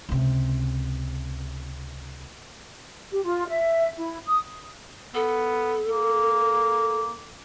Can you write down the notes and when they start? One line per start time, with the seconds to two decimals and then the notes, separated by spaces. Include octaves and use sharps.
0.09 C#2 C3
3.12 G4
3.24 F4
3.49 E5
3.98 E4
4.26 D#6
5.15 B3 A4
5.90 A#3